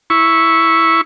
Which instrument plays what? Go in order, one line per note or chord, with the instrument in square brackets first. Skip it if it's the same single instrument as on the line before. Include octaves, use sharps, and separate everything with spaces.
[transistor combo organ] E4 C#6